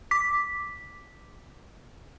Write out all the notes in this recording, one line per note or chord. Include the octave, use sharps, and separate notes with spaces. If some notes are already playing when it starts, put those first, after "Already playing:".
D6 B6